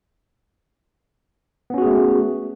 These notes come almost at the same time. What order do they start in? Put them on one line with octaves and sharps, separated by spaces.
B3 C#4 F#4 G#4 A3